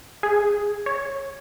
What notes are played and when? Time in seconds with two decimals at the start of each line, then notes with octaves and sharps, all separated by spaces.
0.23 G#4
0.86 C#5